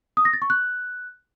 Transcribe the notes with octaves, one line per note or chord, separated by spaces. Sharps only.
D#6
A#6
A6
C#6
F#6